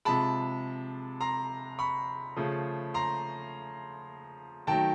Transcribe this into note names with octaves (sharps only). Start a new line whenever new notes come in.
C3 F3 G#3 A5 B5
A#5 C6
B5 C#6
C#3 F3 A3
A#5 C6
D#3 F#3 A3 G5 A5